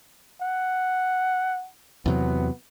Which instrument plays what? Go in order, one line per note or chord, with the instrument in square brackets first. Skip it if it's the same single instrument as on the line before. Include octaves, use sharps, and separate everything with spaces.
[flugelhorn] F#5
[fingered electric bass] E2 C3 F#3 [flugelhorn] B3